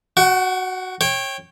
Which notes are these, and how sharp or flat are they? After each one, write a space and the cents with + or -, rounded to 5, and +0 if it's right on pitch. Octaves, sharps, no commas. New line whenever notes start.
F#4 +0 F#5 +45
C#5 -25 G5 +0